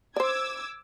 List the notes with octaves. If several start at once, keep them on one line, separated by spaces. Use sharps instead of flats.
C5 D5 D6 E6 G#6